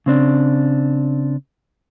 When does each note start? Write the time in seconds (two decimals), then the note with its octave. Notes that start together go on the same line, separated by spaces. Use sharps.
0.06 C#3 C4 D4